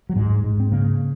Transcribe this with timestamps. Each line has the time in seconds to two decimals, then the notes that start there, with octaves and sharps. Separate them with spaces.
0.09 F#3
0.16 G#2 G#3
0.44 G#2
0.60 C4
0.72 C#3 A#3